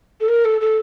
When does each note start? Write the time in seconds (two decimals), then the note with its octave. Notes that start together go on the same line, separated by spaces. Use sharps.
0.21 A4
0.28 A#4
0.45 A4
0.61 A4